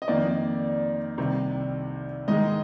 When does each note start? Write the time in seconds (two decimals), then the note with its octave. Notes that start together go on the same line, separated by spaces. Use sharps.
0.02 D#5
0.08 F2 D#3 A#3 D5
1.18 C2 C3 D#3
2.28 G#2 D#3 G#3 D#5